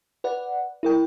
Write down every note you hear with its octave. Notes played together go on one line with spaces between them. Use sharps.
B4 D5 F#5
E4 A#4 G5